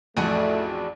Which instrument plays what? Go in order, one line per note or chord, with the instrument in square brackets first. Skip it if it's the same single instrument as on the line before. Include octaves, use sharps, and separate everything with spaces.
[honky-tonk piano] A1 F2 [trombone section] A3 [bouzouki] D4 F#4 G#4